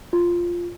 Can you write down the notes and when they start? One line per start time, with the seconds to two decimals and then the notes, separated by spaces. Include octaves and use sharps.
0.13 F4